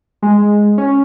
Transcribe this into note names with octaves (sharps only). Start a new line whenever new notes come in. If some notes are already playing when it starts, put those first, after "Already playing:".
G#3
C#4